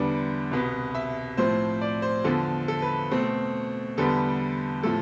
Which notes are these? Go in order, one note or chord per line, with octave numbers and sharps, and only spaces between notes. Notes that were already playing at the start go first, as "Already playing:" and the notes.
Already playing: E2 D3 G3 B3 D4
C2 B2 B3
E5
A2 F3 C4 C5
D5
C5
E2 D3 F3 A4
A4
B4
B2 A3 C4
E2 D3 G3 B3 A4
A2 F3 A4